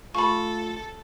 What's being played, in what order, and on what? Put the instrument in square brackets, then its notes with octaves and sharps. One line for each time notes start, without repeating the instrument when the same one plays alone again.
[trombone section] A3 F4 [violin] A4 [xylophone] B5 C#6